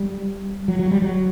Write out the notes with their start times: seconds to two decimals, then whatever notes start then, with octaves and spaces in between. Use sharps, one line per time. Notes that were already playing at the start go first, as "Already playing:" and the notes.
Already playing: G3
0.68 F#3
0.79 F#3
0.91 G3
1.02 F#3